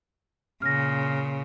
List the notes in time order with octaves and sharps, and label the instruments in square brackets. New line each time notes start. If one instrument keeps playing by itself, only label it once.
[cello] A#2 C#3 [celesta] F6 A#6